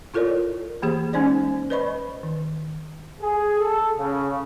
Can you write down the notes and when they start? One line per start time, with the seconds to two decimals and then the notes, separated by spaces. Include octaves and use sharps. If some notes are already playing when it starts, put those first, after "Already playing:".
0.14 E4 F4 A4 A#4 C#5 D5
0.82 E3 A#3 G4 G#4 C5
1.13 G#3 C#4 D#4 C5 D5
1.70 B4 C5 D5 D#5 B5 C#6
2.23 D#3
3.21 G#4
3.60 A4
3.98 C#3